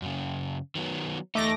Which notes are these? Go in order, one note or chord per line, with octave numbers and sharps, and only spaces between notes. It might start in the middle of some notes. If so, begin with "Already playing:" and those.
F#2 C#3
D#3 F#3 B3
E2 A3 D#4 D6 A#6